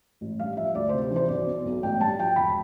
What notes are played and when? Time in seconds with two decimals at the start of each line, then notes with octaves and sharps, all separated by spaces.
0.21 A1
0.39 G2 F5
0.57 F3 E5
0.75 D2 D5
0.89 C5
0.93 C3
1.01 C5
1.11 E3
1.16 C5
1.28 B1 D5
1.47 B2
1.65 B1
1.83 A1 G5
2.00 G2 A5
2.18 F3 G5
2.36 E1 B5